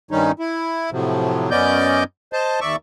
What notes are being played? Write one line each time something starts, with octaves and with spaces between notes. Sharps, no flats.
G2 D#3 G3 C#4 D#4
E4
A2 C3 F3 F#3
F#2 B3 C#4 D5 D#5 G6
C5 D#5 A5
D#2 D5 E5 C#6